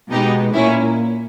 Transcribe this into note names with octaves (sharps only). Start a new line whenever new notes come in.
B2 G#3 B3 D#4 G4
A#2 A#3 C#4 E4